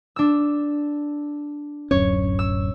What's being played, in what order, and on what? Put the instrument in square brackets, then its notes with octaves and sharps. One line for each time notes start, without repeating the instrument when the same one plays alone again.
[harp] D4 E6
[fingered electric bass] D1 F#2 C#4 [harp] C#5
[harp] E6